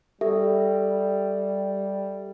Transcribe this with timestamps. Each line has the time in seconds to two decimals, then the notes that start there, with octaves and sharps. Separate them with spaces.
0.21 G3 G4 A4 E5